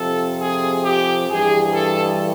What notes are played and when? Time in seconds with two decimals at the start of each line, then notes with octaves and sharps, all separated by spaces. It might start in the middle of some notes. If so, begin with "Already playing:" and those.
Already playing: F2 C3 F3 A4
0.39 G#4
0.83 G4
1.28 G2 E3 G#4
1.73 A4